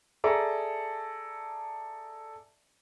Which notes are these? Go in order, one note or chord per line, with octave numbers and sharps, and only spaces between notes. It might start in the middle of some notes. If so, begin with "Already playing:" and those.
G#4 A4 D5 E5 A#5